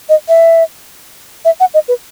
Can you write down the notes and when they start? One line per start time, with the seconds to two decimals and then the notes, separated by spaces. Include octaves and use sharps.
0.09 D#5
0.28 E5
1.45 E5
1.60 F#5
1.74 D#5
1.88 B4